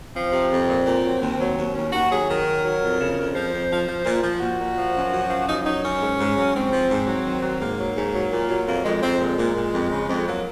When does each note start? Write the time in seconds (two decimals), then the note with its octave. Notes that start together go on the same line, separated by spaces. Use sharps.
0.16 F3 C4
0.33 C3
0.51 F2
0.68 A#2
0.87 A#2
1.04 F#3
1.22 D#2
1.39 F#3
1.58 D#2
1.75 D#2 C#4
1.92 D#2 F#4
2.10 F#3 G#4
2.28 D#3 A#4
2.47 F#3
2.64 F#3
2.81 F2
3.00 C#3
3.18 F2
3.35 F3 C5
3.52 F2
3.71 F3
3.88 F3
4.05 A#2
4.23 F3
4.41 A#2 F#4
4.59 A#2
4.77 F3
4.94 F#2
5.12 F#2
5.30 F3
5.47 F#2 D#4
5.65 F#3 D#4
5.83 F#2 C#4
6.00 G#2
6.18 G#2
6.37 F#3
6.55 G#2 C4
6.72 F3
6.89 G#2
7.07 F#3
7.25 D#3
7.42 F#3
7.60 G#2 A#3
7.78 F#3
7.97 G#2
8.14 F#3
8.31 A#2
8.50 F#3
8.67 F2 A#3
8.84 F2 G#3
9.02 F2 C4
9.20 A#2 G#3
9.39 A#2
9.56 A#2
9.73 F2
9.91 C#3
10.08 F2
10.27 F#3 A#3